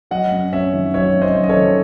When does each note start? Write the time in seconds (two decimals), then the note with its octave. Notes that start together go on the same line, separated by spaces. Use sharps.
0.11 F#3 D#5 F#5
0.32 F#2
0.52 F#2 C#5 E5
0.73 D#3
0.94 F#3 C#5 E5
1.15 F#2
1.22 C5 D#5
1.36 F#2
1.44 D#5
1.49 A4 C#5
1.57 D#3